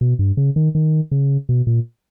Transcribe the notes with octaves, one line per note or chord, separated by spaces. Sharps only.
B2
G2
C#3
D#3
D#3
C#3
B2
A#2